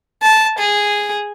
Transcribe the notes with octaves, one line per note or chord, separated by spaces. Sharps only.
A5
G#4